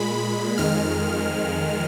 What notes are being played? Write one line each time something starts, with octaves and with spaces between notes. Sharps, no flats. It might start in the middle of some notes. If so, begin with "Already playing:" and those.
Already playing: A#2 G#3 B5
F2 D#3 G#3 F6